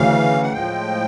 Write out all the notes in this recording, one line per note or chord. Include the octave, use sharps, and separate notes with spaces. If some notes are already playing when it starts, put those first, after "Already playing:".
Already playing: D2 C#3 E3 F5
F#5
A2 F3 G#3 G5